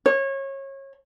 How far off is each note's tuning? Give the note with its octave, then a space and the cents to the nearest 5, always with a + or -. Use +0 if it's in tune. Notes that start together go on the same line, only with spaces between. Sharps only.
C#5 -25